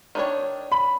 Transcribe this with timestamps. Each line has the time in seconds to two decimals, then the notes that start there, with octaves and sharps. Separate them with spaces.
0.15 D#3 D4 C#5
0.72 B5